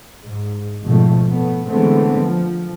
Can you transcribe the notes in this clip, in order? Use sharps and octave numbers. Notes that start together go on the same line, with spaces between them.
G#2
G#1 F2 B2 F3 A3
A2 A3 B3
D3 E3 G#3 A3 B3 C4
F3